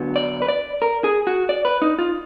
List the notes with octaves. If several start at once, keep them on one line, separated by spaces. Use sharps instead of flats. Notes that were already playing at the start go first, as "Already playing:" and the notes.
Already playing: D3 F#3 B3
D5
B4
D5
A#4
G#4
F#4
D5
B4
D#4
F4